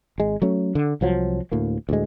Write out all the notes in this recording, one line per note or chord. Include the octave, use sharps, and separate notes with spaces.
G#1 G#3
F#3 A3 C#4
D3
C2 F3 F#3
D2 A2 A#3
D2 A2 G#3